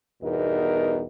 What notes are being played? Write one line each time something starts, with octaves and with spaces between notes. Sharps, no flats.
E2 G2 B2 D#4 A#4 D#5